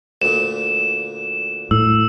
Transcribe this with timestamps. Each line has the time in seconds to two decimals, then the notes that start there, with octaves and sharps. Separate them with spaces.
0.22 D2 A#2 E7
1.71 A2 E6